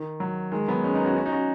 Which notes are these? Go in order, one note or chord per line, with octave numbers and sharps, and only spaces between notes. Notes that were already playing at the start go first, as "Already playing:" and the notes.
Already playing: D#3
F#3
D#3 G#3
F#3 B3
G#3 C#4
B3 D#4
C#4 F#4
C#4 F#4
D#4
C#4 F#4